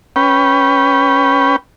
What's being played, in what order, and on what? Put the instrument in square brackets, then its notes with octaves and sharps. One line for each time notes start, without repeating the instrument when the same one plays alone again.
[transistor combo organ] C#4 B4 G5